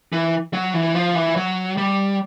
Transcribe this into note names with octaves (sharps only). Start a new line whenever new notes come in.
E3
F#3
E3
F3
E3
F#3
G3